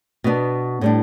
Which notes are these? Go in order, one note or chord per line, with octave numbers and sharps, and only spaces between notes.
B2 B3 D4
A2 G3 D4